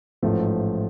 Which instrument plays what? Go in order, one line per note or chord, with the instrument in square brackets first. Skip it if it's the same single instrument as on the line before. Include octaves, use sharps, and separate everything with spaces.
[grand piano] A1 G#2 F3 A3